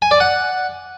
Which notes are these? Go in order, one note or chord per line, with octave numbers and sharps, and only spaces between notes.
G#5
D5
F#5